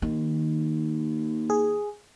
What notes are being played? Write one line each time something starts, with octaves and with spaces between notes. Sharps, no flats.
D#2 D#3
G#4